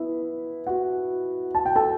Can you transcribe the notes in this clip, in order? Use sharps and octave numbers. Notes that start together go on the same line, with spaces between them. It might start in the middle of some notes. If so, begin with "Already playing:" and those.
Already playing: B3 E4 E5
F#4 F#5
A5
G5
A4 A5